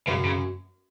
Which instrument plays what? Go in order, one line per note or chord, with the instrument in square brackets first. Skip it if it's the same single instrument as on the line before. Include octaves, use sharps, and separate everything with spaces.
[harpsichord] F#2 [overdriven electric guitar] C#3
[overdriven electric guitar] C#3